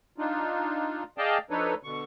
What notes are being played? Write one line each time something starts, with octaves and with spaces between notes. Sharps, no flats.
D4 D#4 F4
G#4 D5 D#5 F5 G5 A5
F3 D4 D#4 A4 B4 C#5
B2 D3 C#6